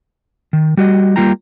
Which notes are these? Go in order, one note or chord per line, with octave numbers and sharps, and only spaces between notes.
D#3
G3 F#4 D#5
G3 A#3 F4 G5 A#5